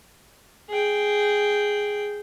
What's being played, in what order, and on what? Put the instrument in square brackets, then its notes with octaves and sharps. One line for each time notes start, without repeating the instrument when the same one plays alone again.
[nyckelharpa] G#4 G5